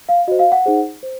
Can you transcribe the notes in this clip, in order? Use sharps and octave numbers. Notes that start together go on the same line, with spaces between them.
F5
F#4 C5 D#5
F5
F#5
D#4 G#4 C5
C5